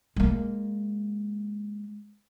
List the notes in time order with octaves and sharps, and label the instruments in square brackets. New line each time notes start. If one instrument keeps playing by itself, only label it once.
[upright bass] G#3 A#3